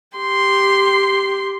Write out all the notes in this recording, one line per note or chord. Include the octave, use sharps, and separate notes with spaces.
G4 C6